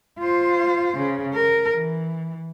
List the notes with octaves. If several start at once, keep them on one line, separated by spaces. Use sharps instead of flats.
F4 C5
C#3
A#4
E3